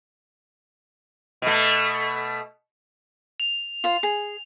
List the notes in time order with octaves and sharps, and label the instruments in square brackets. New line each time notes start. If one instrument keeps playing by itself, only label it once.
[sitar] B2 A3
[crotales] F7
[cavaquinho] F4 C5
G#4